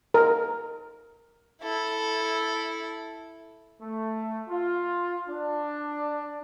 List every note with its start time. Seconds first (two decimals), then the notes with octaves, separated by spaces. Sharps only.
0.14 A#4
1.62 E4 A4
3.80 A3
4.48 F4
5.27 D4